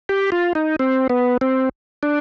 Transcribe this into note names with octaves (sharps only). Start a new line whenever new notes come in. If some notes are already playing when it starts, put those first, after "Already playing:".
G4
F4
D#4
C4
B3
C4
D4